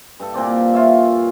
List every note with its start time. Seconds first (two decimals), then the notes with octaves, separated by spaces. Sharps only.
0.20 G2 A4
0.34 A#2 A#3 C4 D5
0.73 F4 C#5 E5